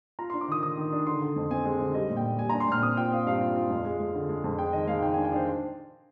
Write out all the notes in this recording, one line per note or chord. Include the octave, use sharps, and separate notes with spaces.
F4 A#5
D4 C6
D6
D#3 D#6
D#3 D#6
D#3
D4
D3 C6
D3
F2
C4 G#5
G#3
D3
G3 D#5
A#2
G5
A#2
G3 G#5
D4 A#5
C6
A#2 F6
C4 D#6
F4 G5
C4 F5
G2 F5
F4
F4
F2
G#3
G#3
D3
G#3
F2
G#3 G5
D#3 D#5
G#3 F5
D#3 G5
D4 G#5
G5
D4 C5